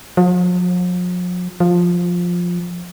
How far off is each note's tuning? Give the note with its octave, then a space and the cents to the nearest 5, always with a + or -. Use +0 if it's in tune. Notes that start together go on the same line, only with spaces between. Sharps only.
F3 +45
F3 +10